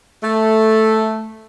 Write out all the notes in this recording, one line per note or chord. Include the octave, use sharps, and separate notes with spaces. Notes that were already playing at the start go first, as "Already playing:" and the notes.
A3